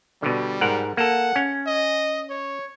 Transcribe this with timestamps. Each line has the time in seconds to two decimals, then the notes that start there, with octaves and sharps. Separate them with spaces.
0.22 B2 D3 G3
0.61 G#2 A#4 F#5
0.97 A#3 A4 F#5
1.36 C#4
1.67 D#5
2.30 C#5